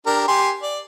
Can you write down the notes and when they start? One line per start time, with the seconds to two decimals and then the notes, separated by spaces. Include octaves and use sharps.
0.06 D4 G4 A#4
0.28 G4 G#5 C6
0.62 D5